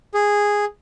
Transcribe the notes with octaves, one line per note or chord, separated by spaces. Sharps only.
G#4